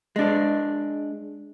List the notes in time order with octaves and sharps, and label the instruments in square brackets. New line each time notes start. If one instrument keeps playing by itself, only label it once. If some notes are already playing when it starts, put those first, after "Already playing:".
[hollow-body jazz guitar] G#3 D4